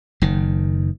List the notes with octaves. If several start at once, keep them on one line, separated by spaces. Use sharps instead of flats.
F#1 D#3